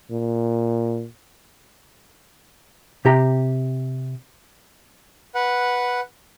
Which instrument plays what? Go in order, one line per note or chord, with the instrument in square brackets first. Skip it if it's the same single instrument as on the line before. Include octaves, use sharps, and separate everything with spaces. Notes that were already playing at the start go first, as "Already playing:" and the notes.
[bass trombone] A#2
[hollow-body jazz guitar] C3 G4 A#5
[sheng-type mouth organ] B4 F#5